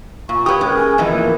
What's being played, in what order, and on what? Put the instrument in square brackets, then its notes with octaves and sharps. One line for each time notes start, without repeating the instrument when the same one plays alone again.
[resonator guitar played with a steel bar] A#2 [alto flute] C#6
[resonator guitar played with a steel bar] G4 B4 [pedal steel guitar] C#5 F#5 D#6
[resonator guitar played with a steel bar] G#3 [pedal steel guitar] C#4 G#4 A#4
[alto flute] G#5
[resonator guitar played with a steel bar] F2 A2 E3 [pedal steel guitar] B3 D#4 E4 [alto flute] D#5
[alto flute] A#3